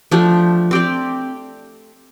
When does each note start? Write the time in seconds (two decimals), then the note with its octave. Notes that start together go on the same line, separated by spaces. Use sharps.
0.11 F3 A3 D4 G4
0.71 C4 G4 D5